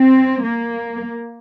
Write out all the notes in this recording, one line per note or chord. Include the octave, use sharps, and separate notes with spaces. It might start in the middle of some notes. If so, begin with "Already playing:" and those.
Already playing: C4
A#3